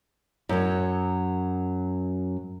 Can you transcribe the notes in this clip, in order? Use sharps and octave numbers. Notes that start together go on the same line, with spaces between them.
F#2 F#3